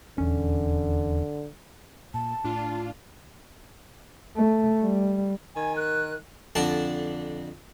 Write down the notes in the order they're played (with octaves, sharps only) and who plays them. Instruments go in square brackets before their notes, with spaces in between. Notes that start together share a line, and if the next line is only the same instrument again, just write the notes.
[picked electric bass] D#1 E2 C#4 [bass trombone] D3
[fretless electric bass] A#2 [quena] A5
[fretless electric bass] A2 [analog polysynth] D4 F4
[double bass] A3
G3
[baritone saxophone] D#3 [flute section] G#5
[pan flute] A#4 [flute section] F#6
[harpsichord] F2 D3 D4 A5